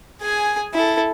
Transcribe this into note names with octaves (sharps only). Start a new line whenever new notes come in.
G#4 G#5
E4 A4